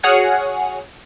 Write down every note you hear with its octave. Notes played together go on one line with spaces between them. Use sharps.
F#4 G#4 C#5 F#5 G#5 F6